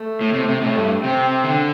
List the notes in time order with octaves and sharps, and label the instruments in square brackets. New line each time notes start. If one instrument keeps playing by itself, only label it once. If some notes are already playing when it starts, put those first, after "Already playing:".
Already playing: [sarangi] A3
[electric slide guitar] A2
C3
C3
[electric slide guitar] A2 [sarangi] A3
[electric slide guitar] G2
[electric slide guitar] C3 [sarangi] C4
[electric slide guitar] D3